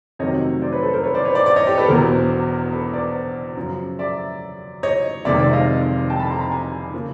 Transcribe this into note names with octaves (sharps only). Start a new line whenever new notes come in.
F2 C3 D#3 F#3 A3 C#5 D#5
C5 D5
B4 C#5
A4 B4
A#4 C5
B4 C#5
C5 D5
B4 C#5
C5 D5
C5 D5
C#5 D#5
G4 A4
A4 B4
E1 E2 B2 A#4 C5
A4 B4
C5 D5
F#2 C#3 F3
D5 E5
C#5 D#5
F1 F2 C3 D#3 G#3 D5 E5
D5 E5
D#5 F5
G5 A5
A5 B5
A#5 C6
A#5 C6
G#5 A#5
C#3 F3 A#3